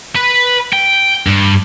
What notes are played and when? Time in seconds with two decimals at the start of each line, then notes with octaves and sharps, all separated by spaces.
0.15 B4
0.73 G5
1.27 G2